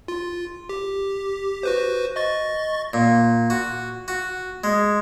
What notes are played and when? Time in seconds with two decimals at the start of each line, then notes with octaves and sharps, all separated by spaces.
0.08 F4
0.69 G4
1.63 F#4 B4 C5
2.16 D#5 C#6 A6
2.93 A#2
3.50 F#4
4.08 F#4
4.64 G#3